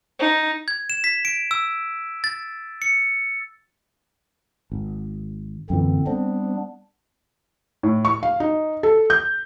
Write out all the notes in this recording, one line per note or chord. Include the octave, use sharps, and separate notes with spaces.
D#4
G#6
E7
B6
D7
E6
A6
C#7
G#1
F#2 A#2 D3 E3 C4
G3 B3 C4 D4
A2
C#6
F5
D#4
A4
G6